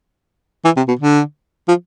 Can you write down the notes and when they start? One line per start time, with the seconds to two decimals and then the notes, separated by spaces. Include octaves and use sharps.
0.65 E3
0.77 C3
0.88 B2
0.99 D3
1.68 F3